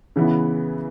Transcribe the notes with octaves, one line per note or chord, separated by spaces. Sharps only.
C#3 E3 B3 E4